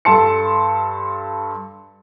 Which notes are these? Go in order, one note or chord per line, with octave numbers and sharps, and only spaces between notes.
G2 A4 A5 C6 C#7